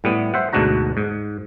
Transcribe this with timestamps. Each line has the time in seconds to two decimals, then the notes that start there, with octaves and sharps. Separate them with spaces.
0.04 A2 G3 B3
0.34 C5 E5 F#5
0.53 D2 G#2 B2 D4 F#4 A#5
0.97 G#2